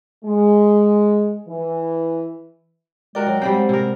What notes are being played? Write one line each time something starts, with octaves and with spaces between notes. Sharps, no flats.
G#3
E3
G#3 F#4 A#4 D5 G5
F#3
G3 G#3 A#3 C4 C5 F#5 G5
C3 A#4